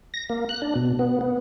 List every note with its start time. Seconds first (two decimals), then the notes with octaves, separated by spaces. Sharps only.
0.14 A#6
0.30 A#3
0.49 F#6
0.62 D4
0.76 B2
0.99 B3
1.21 B3